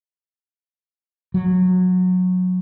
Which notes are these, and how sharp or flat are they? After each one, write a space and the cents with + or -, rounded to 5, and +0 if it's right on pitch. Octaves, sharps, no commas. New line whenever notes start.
F#3 -20